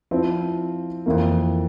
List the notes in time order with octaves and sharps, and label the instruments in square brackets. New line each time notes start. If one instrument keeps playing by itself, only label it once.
[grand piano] F3 C4 E4
F2 E3 A#3